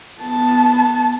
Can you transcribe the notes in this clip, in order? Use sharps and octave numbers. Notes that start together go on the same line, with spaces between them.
B3 A5